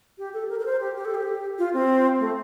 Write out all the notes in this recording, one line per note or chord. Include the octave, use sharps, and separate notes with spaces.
G4
A4
A#4
A#4
C5
G4
G4
A4
G4
F4
C4
A3